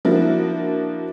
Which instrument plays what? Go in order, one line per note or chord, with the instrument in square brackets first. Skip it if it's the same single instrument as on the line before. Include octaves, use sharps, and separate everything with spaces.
[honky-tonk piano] F3 A#3 D4 E4 F#4